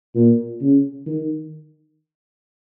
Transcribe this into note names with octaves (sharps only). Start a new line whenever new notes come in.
A#2
C#3
D#3